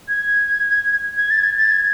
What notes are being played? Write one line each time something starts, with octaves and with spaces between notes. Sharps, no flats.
G#6
G#6
A6
G#6
A6
G#6